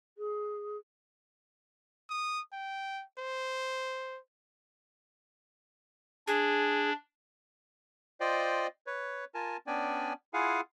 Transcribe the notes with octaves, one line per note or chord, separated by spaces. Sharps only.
G#4
D#6
G5
C5
D4 G#4
F4 C5 D5 D#5 G5
B4 C#5
F4 A#4 G#5 A5
B3 C#4 D4 D5 G5 G#5
E4 F4 G#4 F5 F#5 G#5